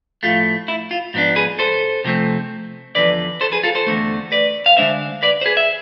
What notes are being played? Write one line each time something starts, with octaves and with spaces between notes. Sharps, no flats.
A2 F3 A3 F4
E4
F4
G#2 F3 B3 D4
G#4 B4
A4 C5
C3 F3 A3 C4
E2 D3 F3 B4 D5
A4 C5
G#4 B4
F4 A4
A4 C5
E2 D3 A3
B4 D5
F5
D3 G#3 D4 C5 E5
B4 D5
C5
G#4 B4
E5